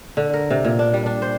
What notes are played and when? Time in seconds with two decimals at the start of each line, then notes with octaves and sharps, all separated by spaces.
0.17 D3
0.33 A#4
0.50 C3
0.65 A#2
0.79 D4
0.94 G3
1.06 D4
1.22 C5